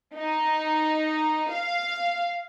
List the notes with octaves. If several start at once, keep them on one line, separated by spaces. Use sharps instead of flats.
D#4
F5